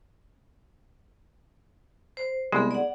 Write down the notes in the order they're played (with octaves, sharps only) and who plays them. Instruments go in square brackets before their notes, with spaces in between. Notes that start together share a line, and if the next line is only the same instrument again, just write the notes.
[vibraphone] C5
[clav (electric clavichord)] C2 G#3 [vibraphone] B3 G#4
[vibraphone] D5 F#5